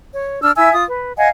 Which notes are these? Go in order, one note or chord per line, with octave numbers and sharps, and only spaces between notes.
C#5
D4 E6 F6
E4 E5 G#5 E6
F4 D#6
B4
D#5 F5 F#5 G#5